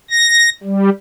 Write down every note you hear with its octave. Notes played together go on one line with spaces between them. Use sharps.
A#6
G3